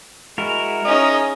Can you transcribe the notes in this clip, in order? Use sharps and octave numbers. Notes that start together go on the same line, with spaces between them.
G#3 E4 F#4 A#4
C#4 D#4 G#4 D#5